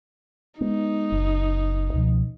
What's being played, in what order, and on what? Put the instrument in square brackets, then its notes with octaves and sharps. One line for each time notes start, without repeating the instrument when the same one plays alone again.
[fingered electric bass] G#3 B3 [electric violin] D#4
[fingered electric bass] F#1
C#2 B2 F3